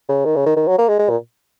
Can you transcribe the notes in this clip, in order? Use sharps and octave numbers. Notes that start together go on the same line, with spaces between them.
C#3
D#3
C#3
D#3
D#3
F#3
A#3
G#3
G#3
A#2